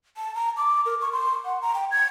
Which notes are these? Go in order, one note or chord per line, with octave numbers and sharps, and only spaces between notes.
A5
A#5
D6
A#4
C#6
C6
F#5
A#5
G5
G#6